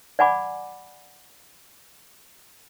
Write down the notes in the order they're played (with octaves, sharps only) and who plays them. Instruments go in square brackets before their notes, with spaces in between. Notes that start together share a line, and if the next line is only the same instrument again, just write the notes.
[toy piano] D5 F#5 G#5 B5 D6